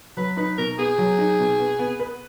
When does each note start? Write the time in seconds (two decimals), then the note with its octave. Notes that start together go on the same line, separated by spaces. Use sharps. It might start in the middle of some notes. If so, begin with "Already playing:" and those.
0.17 F#3 B4
0.37 D#4 B4
0.58 B2 A#4
0.78 B3 G#4
0.98 F#3
1.18 D#4
1.39 B2
1.59 B3
1.79 B3
2.00 B4